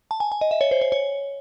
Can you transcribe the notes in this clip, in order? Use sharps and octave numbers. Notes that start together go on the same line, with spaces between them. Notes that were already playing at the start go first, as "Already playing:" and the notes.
A5
G#5
G#5
D#5
E5
C#5
C5
C#5
C#5